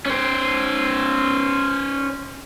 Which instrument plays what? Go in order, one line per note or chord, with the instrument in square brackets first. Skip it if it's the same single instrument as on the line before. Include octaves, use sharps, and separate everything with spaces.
[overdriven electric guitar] C#4 C5